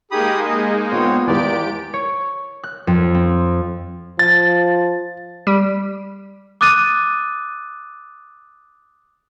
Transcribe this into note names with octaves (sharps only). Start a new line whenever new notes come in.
G#3 A#3 D#4 G4 G#4 B5 D#6
D#5
A#2 B3 C4 C#5
G#1 E2 G4 D5 D7
C#5
F#6
F2
C4
F3 A6
G3
D6 D#6 F#6 A6 D#7